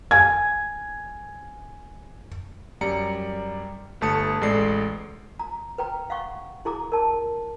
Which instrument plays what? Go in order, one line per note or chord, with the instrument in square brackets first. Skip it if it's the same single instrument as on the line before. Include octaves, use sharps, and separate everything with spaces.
[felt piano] G#5 G#6
[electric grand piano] F#2 G3 D5 A#5 C#7
G1 A3 A5 D#6 C#7
A1 G#3 A4 D5 C7
[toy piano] A#5
B4 G5 A#5
F5 F#5 C#6
E4 G#4 A#5 D6
A#4 A5